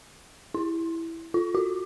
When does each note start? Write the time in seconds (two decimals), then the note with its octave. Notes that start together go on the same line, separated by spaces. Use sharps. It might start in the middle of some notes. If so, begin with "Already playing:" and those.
0.54 E4
1.34 F4
1.55 F#4